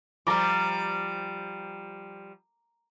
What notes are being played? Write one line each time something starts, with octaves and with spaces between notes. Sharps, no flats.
F3 G3 A#5 D6